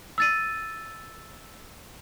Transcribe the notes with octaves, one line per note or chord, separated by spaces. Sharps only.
E6 A6 D#7